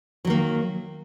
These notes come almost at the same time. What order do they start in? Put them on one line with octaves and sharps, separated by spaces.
F#3 D#3 A#3